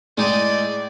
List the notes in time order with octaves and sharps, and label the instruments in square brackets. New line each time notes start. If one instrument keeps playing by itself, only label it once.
[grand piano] A2 [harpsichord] G#3 D#4 D#5 [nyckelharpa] D5